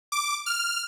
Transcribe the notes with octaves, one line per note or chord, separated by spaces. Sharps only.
D6
F6